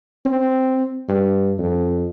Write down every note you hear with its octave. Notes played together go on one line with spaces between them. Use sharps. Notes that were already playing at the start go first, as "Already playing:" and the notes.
C4
G2
F2